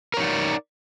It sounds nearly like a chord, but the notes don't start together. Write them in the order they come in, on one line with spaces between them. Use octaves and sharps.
A#4 C#5 D#4 D5